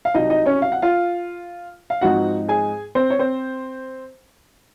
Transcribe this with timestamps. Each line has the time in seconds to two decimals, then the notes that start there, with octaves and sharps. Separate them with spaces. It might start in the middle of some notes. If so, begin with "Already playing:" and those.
0.05 F5
0.14 C2 C3 F#3 D#4 D#5
0.30 D#4 D#5
0.46 C#4 C#5
0.62 F5
0.72 F#5
0.82 F4 F5
1.90 F5
2.01 G#2 F3 C4 D#4 F#4 F#5
2.49 G#4 G#5
2.95 C4 C5
3.10 C#5
3.19 C4 C5